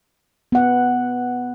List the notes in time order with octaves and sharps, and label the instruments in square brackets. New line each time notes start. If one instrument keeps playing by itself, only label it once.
[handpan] B3 F#5